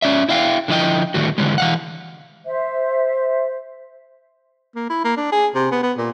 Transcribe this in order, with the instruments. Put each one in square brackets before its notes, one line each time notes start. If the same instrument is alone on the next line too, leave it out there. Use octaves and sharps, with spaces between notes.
[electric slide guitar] C#4 D5 E5
E4 E5 F5 G5
D3 F3 E4 D#5 G5
A2 D3 D#3 G3 A3 F#4
D3 E3 G3 G#3
E3 F5 F#5
[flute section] C5 E5
[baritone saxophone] A#3
E4
A#3
D4
G#4
C3
B3
B3
A#2